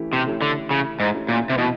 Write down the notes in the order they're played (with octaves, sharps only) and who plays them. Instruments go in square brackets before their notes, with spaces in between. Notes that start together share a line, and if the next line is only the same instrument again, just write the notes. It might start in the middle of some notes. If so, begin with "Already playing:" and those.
Already playing: [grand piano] E3 A3 C#4 E4 G4
[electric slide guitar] C3
[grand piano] A3 C#4 E4 G4
[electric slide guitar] D3
[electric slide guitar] C#3 [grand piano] E3
[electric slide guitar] G#2
[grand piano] A3 C#4 E4 G4
[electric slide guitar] A#2
C3
[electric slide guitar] B2 [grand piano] E3